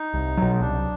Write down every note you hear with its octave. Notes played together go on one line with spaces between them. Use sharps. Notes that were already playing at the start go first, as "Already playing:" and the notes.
Already playing: D#4
C2
B2 F#3
C2 D4